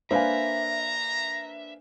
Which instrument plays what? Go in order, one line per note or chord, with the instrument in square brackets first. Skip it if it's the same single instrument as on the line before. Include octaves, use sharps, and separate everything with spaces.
[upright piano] A#3 D4 B4 [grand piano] C5 F5 G#5 [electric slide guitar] E5 [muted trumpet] A#5